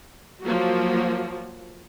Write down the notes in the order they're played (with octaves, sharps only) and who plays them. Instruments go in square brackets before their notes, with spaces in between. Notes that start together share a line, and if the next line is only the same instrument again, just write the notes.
[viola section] F3 F#3 A#3 F#4